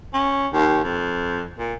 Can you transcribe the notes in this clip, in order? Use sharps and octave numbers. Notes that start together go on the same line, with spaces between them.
C#4
D#2
F2
A#2